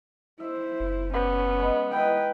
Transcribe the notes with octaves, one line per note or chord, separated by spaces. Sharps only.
E4 C5 E5
F#1
B3 C#4 G4 D5
G#3 B4
D#4 E4 B4 G5